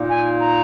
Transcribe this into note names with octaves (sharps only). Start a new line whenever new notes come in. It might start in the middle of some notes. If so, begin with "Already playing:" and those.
Already playing: A#2 A#3 D#4
G#5
A#5